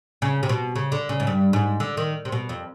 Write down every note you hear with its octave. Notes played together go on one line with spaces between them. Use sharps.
C#3
C3
B2
C#3
D3
C#3
G#2
G2
G#2
D3
D#3
C3
B2
F2